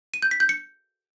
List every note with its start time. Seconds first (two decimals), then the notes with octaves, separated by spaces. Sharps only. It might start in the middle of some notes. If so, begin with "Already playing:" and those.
0.14 D#7
0.22 G6
0.31 B6
0.40 G6
0.49 C#7